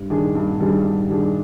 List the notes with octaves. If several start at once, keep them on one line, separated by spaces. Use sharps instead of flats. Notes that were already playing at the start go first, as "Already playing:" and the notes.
Already playing: G2
D#3 G3 D4 G#4
G2
D#3 G3 D4 G#4
G2
D#3 G3 D4 G#4